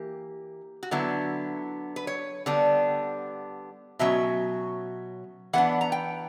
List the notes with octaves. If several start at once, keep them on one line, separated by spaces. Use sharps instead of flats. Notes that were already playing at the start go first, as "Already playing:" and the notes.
Already playing: E3 A#3 G4
F#4
D3 F#3 B3 E4
B4
C#5
D3 G3 B3 D4
B2 F#3 C#4 E5
E3 B3 D4 F#5
A#5
G5